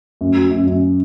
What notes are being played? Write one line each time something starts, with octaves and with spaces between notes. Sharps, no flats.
F#2
F#3
F#2
F#2